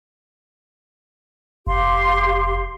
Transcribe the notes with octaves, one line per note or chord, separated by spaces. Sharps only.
F1 G4 F5 C6